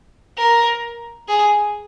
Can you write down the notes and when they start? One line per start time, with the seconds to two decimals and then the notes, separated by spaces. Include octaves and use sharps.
0.38 A#4
1.28 G#4